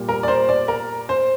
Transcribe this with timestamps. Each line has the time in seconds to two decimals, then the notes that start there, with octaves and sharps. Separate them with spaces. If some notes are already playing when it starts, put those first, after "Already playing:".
Already playing: A#2 G3
0.09 A#4
0.23 D5
0.28 C5
0.49 D5
0.68 A#4
1.09 C5